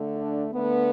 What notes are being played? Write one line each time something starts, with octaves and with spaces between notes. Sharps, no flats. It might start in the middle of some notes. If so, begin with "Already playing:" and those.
Already playing: D3 A3
D4
D3 A3 B3